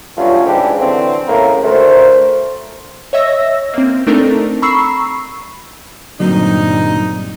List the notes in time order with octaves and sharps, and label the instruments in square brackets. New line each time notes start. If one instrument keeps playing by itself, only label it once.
[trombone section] G2 F3 F#3 A3 C#4 F4
G#2 C#3 E3 D4 G4
D3 E3 F#3 C4
A2 C#3 A3 A#3
D2 A3 A#4 C5
[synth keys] C#5 D#5 E5 E6 A#6
A#3 C4
A3 C4 D4 D#4 A4 A#4
A#5 B5 C#6 E6 C7
[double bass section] G2 A#2 G3 [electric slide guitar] D3 A#3 C4 [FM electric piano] F#3 [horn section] D#4